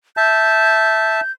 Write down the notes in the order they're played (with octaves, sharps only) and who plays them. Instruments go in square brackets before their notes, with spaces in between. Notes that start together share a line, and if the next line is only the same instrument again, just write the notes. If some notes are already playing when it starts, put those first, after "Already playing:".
[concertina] E5 A5 [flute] G6